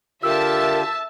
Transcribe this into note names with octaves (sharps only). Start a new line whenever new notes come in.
D3 F4 G4 A#4 E5 A5 E6